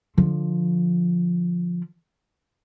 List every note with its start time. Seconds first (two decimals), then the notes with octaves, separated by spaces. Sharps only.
0.17 D3 F3